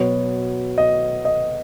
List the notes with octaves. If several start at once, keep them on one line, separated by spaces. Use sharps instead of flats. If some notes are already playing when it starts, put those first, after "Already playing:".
Already playing: B2 F#3 B3 C#5
D#5
D#5